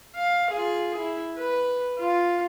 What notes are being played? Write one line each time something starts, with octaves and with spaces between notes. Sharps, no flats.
F5
F4 G#4
E4
B4
F4